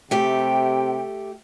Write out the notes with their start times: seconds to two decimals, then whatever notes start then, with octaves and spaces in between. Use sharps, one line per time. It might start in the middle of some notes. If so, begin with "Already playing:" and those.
0.11 C3 A3 G4 G5